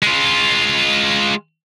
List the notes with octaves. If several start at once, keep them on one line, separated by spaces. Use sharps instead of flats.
G#3 F4